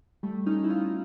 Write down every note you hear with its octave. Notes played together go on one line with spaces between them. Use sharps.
G3 A3
C#4 D#4
E4
D#4 F4